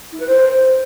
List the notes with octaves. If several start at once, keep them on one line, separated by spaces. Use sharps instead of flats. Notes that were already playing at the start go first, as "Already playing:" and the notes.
E4
B4
C5